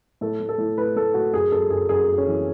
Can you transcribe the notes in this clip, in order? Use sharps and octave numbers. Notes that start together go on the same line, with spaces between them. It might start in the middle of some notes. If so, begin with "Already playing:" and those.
A2 A4
A2
A4
A2
A2 B4
A2 A4
A2 F#4
F#2 G#4
F#2 A4
F#2 G#4
F#2 G#4
F#2
C#4
E3